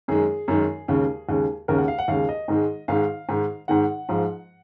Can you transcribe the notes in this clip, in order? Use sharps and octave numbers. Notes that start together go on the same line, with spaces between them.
F#2 D#3 G#3 G#4
F#2 D#3 G#3
D#2 C#3 G#3
D#2 C#3 G#3
D#2 C#3 G#3 A#4
F#5
F5
F#5
D#2 C#3 G#3 F5
D#5
G#2 D#3 G#3
G#2 D#3 G#3 F5
G#2 D#3 G#3
G#2 D#3 G#3 F#5
G#2 F3 G#3